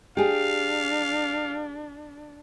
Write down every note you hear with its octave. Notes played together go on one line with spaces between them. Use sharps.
D4 G4 G#4 F5